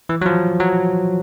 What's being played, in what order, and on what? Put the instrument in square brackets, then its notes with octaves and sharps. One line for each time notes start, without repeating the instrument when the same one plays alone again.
[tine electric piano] E3
F#3
F3
F#3